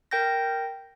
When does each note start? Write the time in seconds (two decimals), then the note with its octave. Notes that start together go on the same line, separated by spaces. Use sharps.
0.11 A#4 G5 G6 A#6